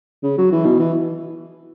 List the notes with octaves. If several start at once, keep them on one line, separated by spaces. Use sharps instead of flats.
C#3
F#3
E3
B2
E3